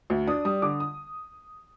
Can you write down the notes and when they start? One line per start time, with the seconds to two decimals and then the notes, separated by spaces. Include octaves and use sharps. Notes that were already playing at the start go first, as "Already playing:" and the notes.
0.10 D2
0.27 D4 D#6
0.45 G3 D#6
0.62 D3 D6
0.80 D#6